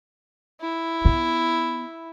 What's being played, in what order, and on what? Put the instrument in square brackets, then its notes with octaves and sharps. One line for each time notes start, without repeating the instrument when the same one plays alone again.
[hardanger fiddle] E4
[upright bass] B3